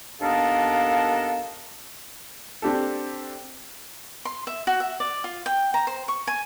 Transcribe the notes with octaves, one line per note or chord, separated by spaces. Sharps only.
D#2 B3 D4 A4 A#4 F5
C4 D4 G4 A4
C6
E5
F#4
E5
D5
F4
G5
A#5
C5
C#6
G#5